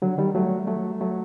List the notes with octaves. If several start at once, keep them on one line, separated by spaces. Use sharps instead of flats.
D3 F#3
D#3 G3
F#3 A3
F#3 A3
F#3 A3